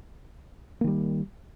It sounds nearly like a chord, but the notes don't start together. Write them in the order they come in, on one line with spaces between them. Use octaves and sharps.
A#3 D#3 G3